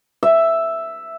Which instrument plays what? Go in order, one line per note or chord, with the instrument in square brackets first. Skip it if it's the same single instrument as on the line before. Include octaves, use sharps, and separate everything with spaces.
[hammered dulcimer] E5